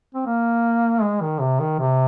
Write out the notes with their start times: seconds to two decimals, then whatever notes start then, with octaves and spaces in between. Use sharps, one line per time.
0.14 C4
0.26 A#3
1.02 G#3
1.21 D#3
1.40 C3
1.60 D#3
1.79 C3